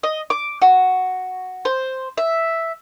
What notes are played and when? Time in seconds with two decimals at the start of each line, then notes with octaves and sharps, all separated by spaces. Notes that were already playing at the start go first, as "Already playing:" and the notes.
0.03 D#5
0.30 D6
0.62 F#4
1.65 C5
2.18 E5